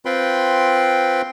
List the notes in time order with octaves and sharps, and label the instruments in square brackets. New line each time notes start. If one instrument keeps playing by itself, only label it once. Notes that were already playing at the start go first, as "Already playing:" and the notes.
[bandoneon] C4 F4 B4 G5 B5 C6